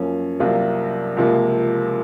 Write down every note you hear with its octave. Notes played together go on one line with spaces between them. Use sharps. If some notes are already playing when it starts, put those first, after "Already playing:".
Already playing: F#2 F3 A#3 C#4
C2 C3 F#3 A#3 F4
C#2 C3 F3 A#3